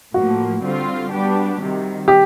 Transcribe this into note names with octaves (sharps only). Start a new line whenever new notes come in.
A2 F3 A#3 F#4
D3 G3 C4 F4
G3 B3 D4 G4
C3 D#3 G3
G4